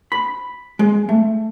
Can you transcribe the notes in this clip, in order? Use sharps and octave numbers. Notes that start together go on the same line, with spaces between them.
B5
G#3
A3